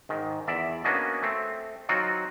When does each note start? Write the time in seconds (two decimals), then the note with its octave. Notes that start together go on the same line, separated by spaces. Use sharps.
0.09 G#2 D#3
0.47 E2 D5 E5
0.84 A#3 B3 C#4 D4 F#4 D#5
1.22 A3 C4
1.89 F#3 C4 D#4 F4 F#4